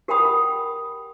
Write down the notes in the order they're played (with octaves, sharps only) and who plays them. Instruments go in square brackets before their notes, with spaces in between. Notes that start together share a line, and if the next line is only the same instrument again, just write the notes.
[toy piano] G4 A#4 F#5 G5 B5 D#6